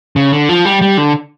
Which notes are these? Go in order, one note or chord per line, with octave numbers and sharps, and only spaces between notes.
C#3
D3
F3
G3
G3
D3